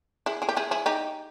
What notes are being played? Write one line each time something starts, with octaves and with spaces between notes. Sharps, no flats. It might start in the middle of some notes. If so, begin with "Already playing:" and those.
E4 G#4
E4 G#4
G4
E4 G#4
E4 G#4
D#4 G4